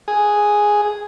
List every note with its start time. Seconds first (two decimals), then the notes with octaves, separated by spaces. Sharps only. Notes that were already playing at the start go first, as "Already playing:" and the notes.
0.08 G#4